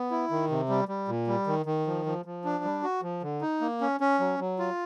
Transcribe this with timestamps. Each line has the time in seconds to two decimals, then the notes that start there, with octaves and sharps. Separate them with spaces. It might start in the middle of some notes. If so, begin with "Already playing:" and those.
Already playing: B3
0.11 E4
0.31 D#3
0.50 C3
0.69 G3
0.88 G3
1.08 A#2
1.27 G3
1.47 D#3
1.66 D#3
1.87 F3
2.06 F3
2.25 F3
2.44 D4
2.64 G3
2.83 F#4
3.02 F3
3.23 D3
3.41 D#4
3.61 A#3
3.81 C#4
4.00 C#4
4.20 F#3
4.39 F#3
4.59 F4